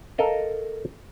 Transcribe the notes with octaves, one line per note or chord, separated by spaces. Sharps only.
A4 A#4 D#5 F5